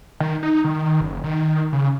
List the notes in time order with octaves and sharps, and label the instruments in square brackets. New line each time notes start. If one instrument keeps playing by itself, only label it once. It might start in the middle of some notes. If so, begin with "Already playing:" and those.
[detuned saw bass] D#3
D#4
D#3
F#1
D#3
C#3